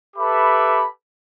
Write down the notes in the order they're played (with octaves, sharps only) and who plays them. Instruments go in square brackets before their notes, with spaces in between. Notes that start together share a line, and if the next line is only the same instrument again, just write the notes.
[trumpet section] G4 A4 B4 E5 B5 D6